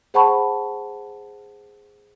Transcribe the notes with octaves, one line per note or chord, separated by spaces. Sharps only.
G#4 C5 F#5 A5 B5 C#6